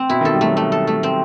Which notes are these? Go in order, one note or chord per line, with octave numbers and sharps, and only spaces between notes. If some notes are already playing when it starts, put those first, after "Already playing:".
Already playing: C4
B2 E4
D#3 A4
G3
F#3 A3
A3
A4
A3
C4